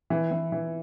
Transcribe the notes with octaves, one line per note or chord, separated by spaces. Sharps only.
E3
E3
E3